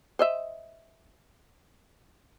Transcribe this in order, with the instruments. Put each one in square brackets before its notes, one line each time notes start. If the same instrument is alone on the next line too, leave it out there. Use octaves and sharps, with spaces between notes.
[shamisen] C5 D#5 E5